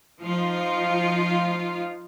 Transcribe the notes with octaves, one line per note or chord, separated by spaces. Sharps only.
F3 D#4 F4